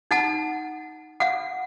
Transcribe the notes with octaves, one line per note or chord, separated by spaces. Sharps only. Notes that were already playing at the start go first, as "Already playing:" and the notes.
D#4 F#5 A5
F5 F#5